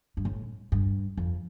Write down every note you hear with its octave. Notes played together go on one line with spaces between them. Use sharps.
G2
A2
G2
F2